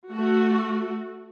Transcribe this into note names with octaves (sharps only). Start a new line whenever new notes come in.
A3 F#4